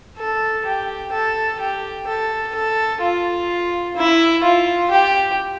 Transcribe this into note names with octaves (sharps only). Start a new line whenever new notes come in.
A4
G4
A4
G4
A4
A4
F4
E4
F4
G4